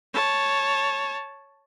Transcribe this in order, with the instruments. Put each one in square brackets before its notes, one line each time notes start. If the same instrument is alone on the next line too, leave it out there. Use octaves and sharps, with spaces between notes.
[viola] C#5 A5